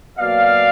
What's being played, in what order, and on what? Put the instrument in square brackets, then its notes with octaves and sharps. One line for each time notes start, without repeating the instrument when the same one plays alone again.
[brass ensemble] B2 F#3 A#3 D5 F5